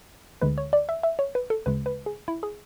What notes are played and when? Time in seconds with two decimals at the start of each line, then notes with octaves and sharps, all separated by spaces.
0.41 D2 D3 G#3 B4
0.58 C#5
0.73 D5
0.89 E5
1.03 E5
1.19 C#5
1.35 B4
1.50 A4
1.66 D2 C#3 G#3 B4
1.86 B4
2.06 G#4
2.28 E4
2.43 G#4